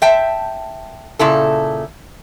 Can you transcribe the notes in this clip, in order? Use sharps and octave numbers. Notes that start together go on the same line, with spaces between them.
E5 G5 A5
A#2 C#3 E4 A4